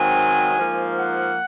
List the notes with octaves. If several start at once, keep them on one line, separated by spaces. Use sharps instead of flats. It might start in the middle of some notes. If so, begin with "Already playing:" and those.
Already playing: G#2 D#3 F#3 C4 G#5
G#2 F3 A#3
F#5